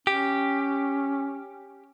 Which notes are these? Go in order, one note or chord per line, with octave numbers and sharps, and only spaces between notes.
C#4 G4